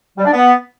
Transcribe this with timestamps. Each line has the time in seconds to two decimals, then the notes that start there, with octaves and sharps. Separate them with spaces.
0.18 G3
0.25 D4
0.33 B3